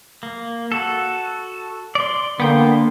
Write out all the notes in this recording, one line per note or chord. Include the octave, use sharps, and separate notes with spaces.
A#3
F#4 A4
D5 C6
D3 A#3 B3 G5 C6